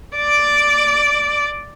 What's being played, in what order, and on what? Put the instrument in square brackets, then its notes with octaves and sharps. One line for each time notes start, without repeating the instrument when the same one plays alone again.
[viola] D5 D6